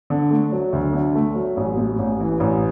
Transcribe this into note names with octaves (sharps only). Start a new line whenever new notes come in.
D3
A3
F#3
D2
D3
A3
F#3
A1
A2
A1
E3
A1